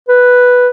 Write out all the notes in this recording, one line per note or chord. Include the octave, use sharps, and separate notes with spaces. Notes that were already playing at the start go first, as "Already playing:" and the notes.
B4